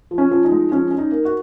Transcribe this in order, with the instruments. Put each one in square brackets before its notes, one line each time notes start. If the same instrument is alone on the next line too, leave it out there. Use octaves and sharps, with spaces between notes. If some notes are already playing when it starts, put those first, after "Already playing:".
[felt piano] F3
C#4
F3
D#4
G#3
F3 C#4
C#4
D#4
A#3
F#4